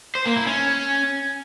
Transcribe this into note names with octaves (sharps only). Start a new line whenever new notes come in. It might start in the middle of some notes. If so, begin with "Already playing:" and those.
C5
A#3
E4
C#4